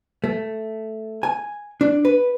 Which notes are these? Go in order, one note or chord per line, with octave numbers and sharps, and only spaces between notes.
A3
G#5
D4
B4